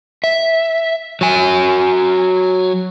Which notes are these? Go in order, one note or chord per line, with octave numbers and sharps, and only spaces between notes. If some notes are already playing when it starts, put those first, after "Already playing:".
E5
F#3 G#5